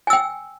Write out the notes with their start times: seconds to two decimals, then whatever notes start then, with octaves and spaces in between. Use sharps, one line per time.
0.07 G#5
0.10 E6
0.13 G5